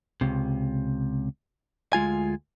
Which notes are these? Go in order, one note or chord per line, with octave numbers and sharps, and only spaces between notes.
C#2 C3
D2 G#3 F4 G#5